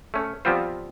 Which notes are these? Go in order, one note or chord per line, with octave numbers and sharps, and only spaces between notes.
A3 C#4
F3 G3 B3 C4 F4 C5